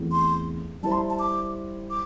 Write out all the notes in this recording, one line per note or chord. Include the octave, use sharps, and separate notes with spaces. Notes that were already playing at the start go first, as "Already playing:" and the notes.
Already playing: E2 E3 A3 C4
C6
G3 E4 C5 A5
C6
A5
D6
D6